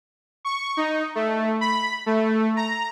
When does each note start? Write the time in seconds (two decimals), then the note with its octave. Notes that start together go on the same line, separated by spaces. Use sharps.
0.45 C#6
0.77 D#4
1.15 A3
1.61 B5
2.06 A3
2.56 A#5